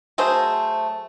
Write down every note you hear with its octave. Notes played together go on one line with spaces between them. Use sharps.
F#3 A3 G#4 C5